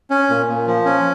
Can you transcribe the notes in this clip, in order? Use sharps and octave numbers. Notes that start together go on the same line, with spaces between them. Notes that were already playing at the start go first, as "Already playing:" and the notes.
C#4
A#2
A#2
F3
C#4